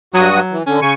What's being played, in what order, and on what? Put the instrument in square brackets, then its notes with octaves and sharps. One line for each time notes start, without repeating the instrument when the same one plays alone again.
[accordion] G2 F#4 D#6 [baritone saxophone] F#3
[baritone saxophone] F#3
[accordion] E3
[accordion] D3 [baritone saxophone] C#4
[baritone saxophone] C#3 [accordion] G#5 C#6